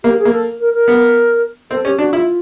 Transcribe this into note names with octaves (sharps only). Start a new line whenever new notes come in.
A#3 G4
G#4
A#3
A4
A#4
A#4
B3
C4 A4
C#4 G4
D4 F#4
E4 F4